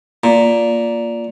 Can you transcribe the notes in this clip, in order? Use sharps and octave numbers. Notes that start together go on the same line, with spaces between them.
A#2